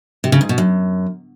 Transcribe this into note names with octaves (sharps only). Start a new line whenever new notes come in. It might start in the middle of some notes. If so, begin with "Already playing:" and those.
C3
C#3
G#2
B2
F#2